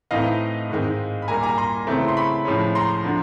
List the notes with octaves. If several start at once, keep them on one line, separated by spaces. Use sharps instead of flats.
A2 E3 A3 C4 D#4 D#5 F5
G#2 D#3 G#3 C4
B5
A#2 G3 A#3 G#5 A#5
G#5 A#5
A#5 C6
C#3 E3 A3 C4
C6
B5 C#6
A2 F3 G#3 C#4
A#5 C6
D3 F3